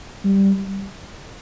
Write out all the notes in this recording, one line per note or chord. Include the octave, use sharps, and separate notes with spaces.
G3